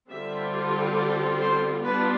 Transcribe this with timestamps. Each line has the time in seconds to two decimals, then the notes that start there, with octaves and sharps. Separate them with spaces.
0.11 D3 G3 C4 F4 E5
0.97 D5
1.40 C5
1.84 G3 B3 D4 F4 B4